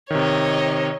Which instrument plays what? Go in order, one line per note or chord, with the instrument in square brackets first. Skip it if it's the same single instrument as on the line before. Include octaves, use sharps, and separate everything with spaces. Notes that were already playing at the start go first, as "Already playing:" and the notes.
[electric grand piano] C3 D#3 [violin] C#5 D#5